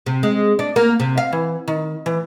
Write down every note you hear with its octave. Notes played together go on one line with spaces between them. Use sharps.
C3
G#3
D4
A#3
C3
F5
E3
D#3
E3